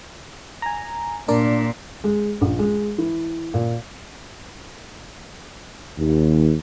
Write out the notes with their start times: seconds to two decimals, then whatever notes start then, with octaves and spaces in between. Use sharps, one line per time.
0.62 G#5 A#5
1.28 A#2 D4 A#4 D5
2.04 G#3
2.41 A#1
2.59 G#3
2.98 E3
3.54 A#2
5.98 D#2